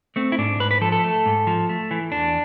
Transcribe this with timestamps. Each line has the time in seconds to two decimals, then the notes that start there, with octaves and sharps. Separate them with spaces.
0.16 A3 C4
0.32 E4
0.39 G#2 D4
0.60 G#2 B4
0.71 B4
0.81 F3 A4
0.92 A4
1.04 A3
1.26 G#2
1.47 F3
1.69 A3
1.91 E3
2.12 E2 D4